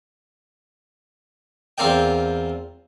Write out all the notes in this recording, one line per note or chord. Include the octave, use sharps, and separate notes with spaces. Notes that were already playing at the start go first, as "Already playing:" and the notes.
E2 C4 F4 A#4 D5 G5